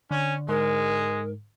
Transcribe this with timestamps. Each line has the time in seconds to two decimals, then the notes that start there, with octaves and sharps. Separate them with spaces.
0.11 D3 C#4
0.49 G#2 G#3 A#4